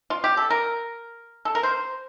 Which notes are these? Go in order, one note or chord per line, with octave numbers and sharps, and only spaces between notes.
F4
G4
A4
A#4
A4
A#4
C5